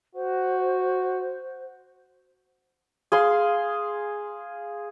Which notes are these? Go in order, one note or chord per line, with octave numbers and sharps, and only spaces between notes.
F#4 C5
G#4 F5 C6